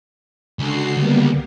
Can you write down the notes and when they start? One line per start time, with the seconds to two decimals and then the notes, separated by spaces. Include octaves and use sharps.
0.59 C#2 D3 F#4 C7
0.97 D3 G3 A#3 B3